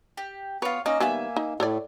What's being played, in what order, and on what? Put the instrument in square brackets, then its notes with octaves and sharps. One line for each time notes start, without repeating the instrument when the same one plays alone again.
[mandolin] G4
[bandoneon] B3 [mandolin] F4 C#5 [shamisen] B4
[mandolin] A#3 [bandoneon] C#4 D#5 [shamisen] D#4
[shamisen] D#3 G3 B3 [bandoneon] A#3 [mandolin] E5 G#5
[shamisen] D#4
[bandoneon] A2 [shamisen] A4 C#5 D5